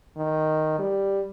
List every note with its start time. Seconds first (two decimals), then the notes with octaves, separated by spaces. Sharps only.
0.17 D#3
0.79 G3